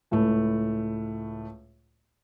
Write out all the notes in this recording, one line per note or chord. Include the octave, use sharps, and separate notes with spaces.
C#2 A2 A3